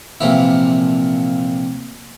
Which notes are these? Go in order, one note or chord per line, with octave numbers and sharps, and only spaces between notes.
A#1 C3 E3 F3 A#3 E4